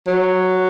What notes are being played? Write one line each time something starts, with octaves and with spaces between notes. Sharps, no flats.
F#3